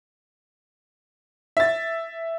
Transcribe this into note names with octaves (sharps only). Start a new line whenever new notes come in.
E5 A6